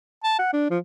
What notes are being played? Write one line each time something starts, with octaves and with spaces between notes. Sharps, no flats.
A5
F#5
D4
F3